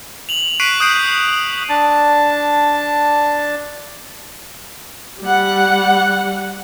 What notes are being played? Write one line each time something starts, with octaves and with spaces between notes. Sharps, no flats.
F7 F#7
C#6 F#6 B6 C7 D7 D#7
D#6 F#6 G6 C7 D7
D4 A5
G3 F#5